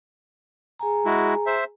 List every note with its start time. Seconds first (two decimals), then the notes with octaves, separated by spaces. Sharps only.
0.79 G#4 G#5 A#5
1.06 G#3 E4 F#4
1.47 C5 E5